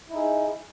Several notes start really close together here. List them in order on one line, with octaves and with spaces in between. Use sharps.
E4 D#4 G#4